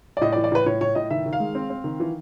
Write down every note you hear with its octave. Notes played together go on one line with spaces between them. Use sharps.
D5
A2 D#5
D5
E3
D5
A2 B4
A2 C#5
A2 C#5
A2 D#5
D#3 E5
D#3
F5
G#3
C4
C4
D#3
E3